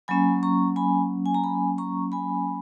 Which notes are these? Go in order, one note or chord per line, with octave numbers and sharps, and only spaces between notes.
F#3 A#3 C#4 G#5 B5
A#5 C#6
G#5 B5
G#5
A#5
G#5 B5
A#5 C#6
G#5 B5